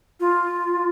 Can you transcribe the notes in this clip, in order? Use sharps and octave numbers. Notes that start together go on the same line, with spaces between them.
F4